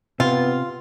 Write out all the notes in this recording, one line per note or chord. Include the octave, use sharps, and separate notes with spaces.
C3 B3 F4